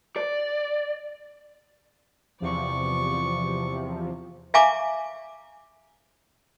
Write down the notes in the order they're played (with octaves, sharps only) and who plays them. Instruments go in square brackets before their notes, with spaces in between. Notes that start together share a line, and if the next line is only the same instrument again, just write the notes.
[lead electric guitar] D5
[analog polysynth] E2 C3 F3 [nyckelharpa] D5 C#6
[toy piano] E5 F5 G#5 A#5 C#6 D6